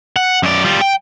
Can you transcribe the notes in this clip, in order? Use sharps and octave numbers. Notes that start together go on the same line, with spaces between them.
F#5
F#2 D5
G3 F4
G5